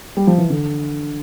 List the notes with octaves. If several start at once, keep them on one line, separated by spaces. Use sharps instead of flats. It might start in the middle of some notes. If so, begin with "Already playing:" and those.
G3
F3
E3
D3